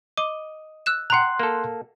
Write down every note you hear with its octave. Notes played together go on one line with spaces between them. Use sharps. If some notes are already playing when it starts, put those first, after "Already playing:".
D#5 D6
E6 F#6 E7
F#5 G5 A#5 C6 F#6
A#3 A4